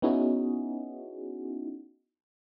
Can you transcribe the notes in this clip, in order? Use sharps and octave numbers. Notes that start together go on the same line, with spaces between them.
B3 C#4 D#4 E4 F#4 G#4